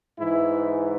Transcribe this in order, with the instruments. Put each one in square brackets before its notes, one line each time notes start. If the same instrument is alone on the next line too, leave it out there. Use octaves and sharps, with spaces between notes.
[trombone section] G#2 E3 E4